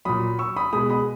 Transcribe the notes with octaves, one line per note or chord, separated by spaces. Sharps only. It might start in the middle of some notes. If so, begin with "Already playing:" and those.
A#2 F#3 B5 D#6
C#6 E6
B5 D#6
B2 G#3 B5 D#6
B5 D#6